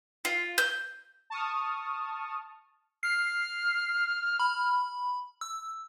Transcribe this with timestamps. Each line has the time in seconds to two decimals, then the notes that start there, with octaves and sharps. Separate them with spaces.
0.25 F4
0.58 G6
1.30 A5 C#6 D#6 F6
3.03 F6 C7
4.39 B5
5.41 E6